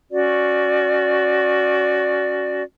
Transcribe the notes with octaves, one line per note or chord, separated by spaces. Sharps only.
C#4 F#4 D5